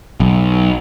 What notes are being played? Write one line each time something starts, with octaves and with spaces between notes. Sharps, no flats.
B1